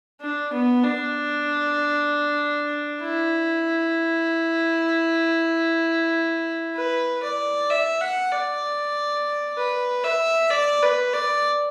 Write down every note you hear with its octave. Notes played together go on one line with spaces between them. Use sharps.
D4
B3
D4
E4
B4
D5
E5
F#5
D5
B4
E5
D5
B4
D5